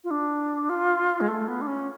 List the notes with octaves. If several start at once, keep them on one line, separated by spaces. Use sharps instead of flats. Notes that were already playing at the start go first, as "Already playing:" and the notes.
F4
D4
F4
G#3
A3
B3
D4
C#4